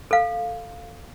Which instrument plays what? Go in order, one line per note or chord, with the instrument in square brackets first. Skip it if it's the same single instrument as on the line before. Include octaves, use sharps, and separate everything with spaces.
[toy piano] A4 F5